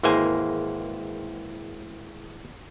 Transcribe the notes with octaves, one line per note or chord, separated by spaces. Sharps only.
G#1 E3 G#3 A#3 C5 G#5